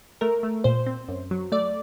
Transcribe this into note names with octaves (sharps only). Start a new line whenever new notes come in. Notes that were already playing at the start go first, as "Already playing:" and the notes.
A3 A#4
A3
A#2 C5
C4
F#2
F#3
A3 D5